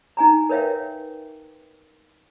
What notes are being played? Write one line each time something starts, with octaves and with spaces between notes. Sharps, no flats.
D#4 G#5 A#5
A#4 B4 C#5 E5 F5 G5